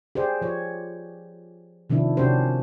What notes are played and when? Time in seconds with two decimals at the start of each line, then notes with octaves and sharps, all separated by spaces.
0.15 G4 G#4 C5 D5
0.41 F3 C#5
1.90 C3 D#3 F3 D4 E4
2.17 C3 C#4 D4 F#4 G4 C5